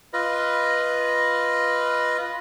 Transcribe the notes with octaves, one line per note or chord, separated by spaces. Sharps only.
F4 B4 D#5